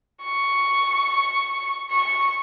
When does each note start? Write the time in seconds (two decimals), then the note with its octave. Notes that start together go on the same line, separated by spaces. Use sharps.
0.24 C#6
1.91 C#6